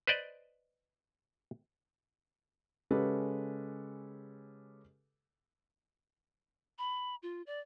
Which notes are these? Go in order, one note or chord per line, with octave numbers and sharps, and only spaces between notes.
B4 C5 D5 D#5
C#3 G#3 C#4 G4 A4 B4
B5
F4
D5